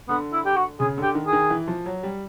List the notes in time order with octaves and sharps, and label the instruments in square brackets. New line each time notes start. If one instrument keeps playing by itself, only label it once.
[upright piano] D3 [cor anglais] B3
[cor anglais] E4
G4
F#4
[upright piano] C#3 [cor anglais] G#4
[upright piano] D3
[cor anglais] G4
[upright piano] D#3
[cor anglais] G#4
[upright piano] D#3
E3
F3
F#3
G3